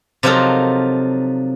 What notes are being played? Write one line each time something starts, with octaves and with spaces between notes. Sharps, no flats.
C3 F3 F#3 D#4 A4 A#4